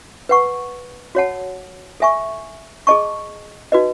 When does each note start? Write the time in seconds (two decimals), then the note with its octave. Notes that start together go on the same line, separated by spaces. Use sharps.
0.29 B4 F#5 C#6
1.15 F#4 C#5 F#5 A5
2.00 A4 E5 G#5 C#6
2.87 G#4 D#5 A5 C#6
3.72 D#4 F#4 B4 D#5